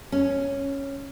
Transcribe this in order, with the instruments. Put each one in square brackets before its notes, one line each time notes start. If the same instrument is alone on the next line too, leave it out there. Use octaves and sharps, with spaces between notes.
[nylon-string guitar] C#4